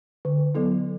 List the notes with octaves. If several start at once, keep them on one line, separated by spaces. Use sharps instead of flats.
D3
F#3 B3 E4 A4